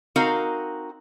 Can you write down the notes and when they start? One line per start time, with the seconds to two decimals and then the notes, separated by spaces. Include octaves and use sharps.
0.16 C4 D#4 F#4 A#4 F5